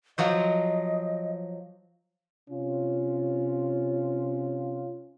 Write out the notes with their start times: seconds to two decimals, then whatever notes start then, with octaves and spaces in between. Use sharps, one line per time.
0.18 F3 F#3 C5 D#5
2.49 C3 C#4 F4